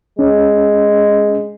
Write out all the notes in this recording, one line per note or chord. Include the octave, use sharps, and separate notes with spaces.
G#3 C#4